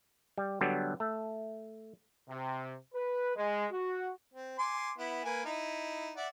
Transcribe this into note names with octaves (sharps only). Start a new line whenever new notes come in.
G3
D3 F#3 G3 B3 D4
A3
C3
B4
G#3
F#4
C4
G#5 C6 D6
B3 E4
A#3 B4 G#5
D#4 E4
D5 E5 F#5